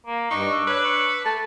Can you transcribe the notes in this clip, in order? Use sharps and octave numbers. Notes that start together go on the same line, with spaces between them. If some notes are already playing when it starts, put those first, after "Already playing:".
A#3
G2 D4 D#4 C#6
E6
B4 C#5
C#6
A3 A5